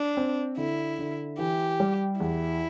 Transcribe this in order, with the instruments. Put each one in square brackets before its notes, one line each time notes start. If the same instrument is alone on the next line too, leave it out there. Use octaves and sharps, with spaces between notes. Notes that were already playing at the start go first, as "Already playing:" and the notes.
Already playing: [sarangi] D4
[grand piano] C4
[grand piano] D3 [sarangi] E4
[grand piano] D3
[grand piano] E3 [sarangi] G4
[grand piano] G3
[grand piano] E2 [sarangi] E4